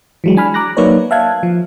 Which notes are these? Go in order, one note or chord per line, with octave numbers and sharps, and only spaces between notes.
E3 F#3 G#3
D4 G#5 B5 F6
A#5 D6 F#6 A#6
F#3 A#3 D#4 B4 C#5 D5
E5 F5 A5 F#6 G#6
F3